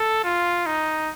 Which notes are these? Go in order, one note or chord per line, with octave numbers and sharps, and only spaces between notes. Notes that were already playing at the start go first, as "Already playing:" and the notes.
Already playing: A4
F4
D#4